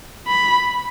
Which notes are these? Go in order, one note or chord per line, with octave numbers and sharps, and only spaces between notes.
B5